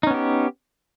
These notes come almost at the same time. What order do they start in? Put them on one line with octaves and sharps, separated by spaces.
D#4 C#4 B3 G4